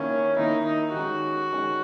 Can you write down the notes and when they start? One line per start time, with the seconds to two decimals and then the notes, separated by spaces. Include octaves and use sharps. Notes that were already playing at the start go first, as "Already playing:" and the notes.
Already playing: D#3 A#3 C#4 E4
0.37 D#3 A#3 D#4 E4
0.65 D#4
0.94 D#3 G#3 C#4 F#4
1.52 D#3 G#3 C#4